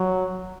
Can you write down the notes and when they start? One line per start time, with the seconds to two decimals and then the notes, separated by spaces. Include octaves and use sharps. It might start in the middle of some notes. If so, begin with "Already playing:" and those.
Already playing: F#3